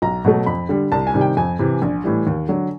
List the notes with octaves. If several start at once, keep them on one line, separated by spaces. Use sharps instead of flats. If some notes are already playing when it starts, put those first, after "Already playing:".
B1 A#5
B2 F#3 A3
F2 B5
D3 G3
C2 A5
G#5
C3 D#3 G3
G5
F2 G#5
C3 E3
A#1
A2 E3 G3
D#2
D3 F#3